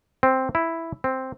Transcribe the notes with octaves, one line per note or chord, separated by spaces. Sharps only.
C4
E4
C4